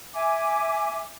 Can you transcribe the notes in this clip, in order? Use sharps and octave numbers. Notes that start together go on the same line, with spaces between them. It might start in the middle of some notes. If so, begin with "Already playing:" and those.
E5 G#5 D6